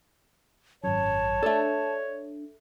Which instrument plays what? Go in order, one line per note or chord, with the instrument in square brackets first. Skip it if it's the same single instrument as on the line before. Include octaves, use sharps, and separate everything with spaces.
[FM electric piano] G#1 F#2 [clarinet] C#5 [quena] A5
[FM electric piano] D4 [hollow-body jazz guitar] A4 E5